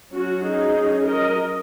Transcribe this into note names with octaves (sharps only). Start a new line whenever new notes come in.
F#3 C#4 F#4
D#4 G#4
F#3 C#4
A#4 D#5